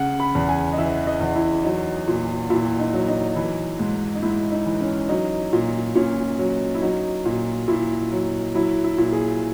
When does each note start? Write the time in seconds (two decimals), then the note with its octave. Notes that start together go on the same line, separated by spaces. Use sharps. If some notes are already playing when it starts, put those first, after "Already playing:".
Already playing: C#3 F#5
0.20 B5
0.35 E2
0.49 G#5
0.73 D#5
0.78 E3 E5
1.07 D#5
1.21 E2
1.36 E4
1.64 F#3 D#4
2.07 A#2
2.50 A#2 E4
2.80 D#4
2.93 F#3
3.08 D#4
3.36 E3
3.79 G#2
4.15 D#4
4.23 G#2 E4
4.52 D#4
4.66 E3
4.81 C#4
5.09 F#3 D#4
5.53 A#2
5.95 A#2 C#4
6.39 F#3
6.75 E4
6.82 F#3 D#4
7.25 A#2
7.68 A#2 E4
8.11 F#3
8.55 F#3 E4
8.84 E4
8.98 A#2
9.12 G#4